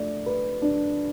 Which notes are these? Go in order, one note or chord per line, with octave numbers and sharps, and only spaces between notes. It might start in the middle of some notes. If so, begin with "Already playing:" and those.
Already playing: A3 D4 D5
B4
D4